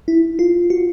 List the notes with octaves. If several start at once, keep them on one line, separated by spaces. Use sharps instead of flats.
E4
F4
F#4